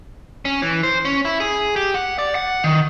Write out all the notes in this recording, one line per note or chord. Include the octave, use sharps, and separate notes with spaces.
C#4
E3
C5
C#4
E4
G#4
G4
F#5
D5
F#5
D#3